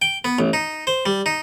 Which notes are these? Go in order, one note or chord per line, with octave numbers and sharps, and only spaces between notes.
G5
B3
A1
D#4
C5
G3
D#4